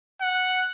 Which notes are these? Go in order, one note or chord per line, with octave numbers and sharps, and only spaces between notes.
F#5